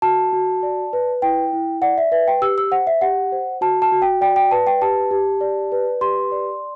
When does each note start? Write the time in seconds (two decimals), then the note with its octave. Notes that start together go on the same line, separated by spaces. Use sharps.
0.02 F#4 A5
0.33 F#4
0.63 D5
0.93 B4
1.22 E4 G5
1.53 E4
1.82 D5 F#5
1.98 E5
2.12 B4 E5
2.27 G5
2.42 G4 E6
2.58 E6
2.72 C5 F#5
2.87 E5
3.01 G4 F#5
3.32 C5
3.61 F#4 A5
3.82 A5
3.92 F#4
4.02 G5
4.21 D5 G5
4.36 G5
4.51 B4 A5
4.67 G5
4.82 G4 A5
5.11 G4
5.41 D5
5.72 B4
6.01 G4 C6
6.32 D5